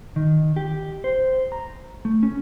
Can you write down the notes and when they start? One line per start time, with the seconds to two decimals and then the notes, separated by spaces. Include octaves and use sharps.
0.16 D#3
0.56 G4
1.04 C5
1.52 A#5
2.05 A3
2.23 C#4